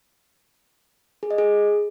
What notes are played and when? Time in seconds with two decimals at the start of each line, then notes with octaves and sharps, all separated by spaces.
1.23 G#4
1.31 D#5
1.38 G#4